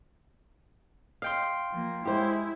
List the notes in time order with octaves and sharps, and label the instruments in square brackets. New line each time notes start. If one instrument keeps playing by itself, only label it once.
[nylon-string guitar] D#5 [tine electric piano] F5 G5 C6
[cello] F3 A#3
[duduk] G#3 [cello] E4 [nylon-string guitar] G4 C5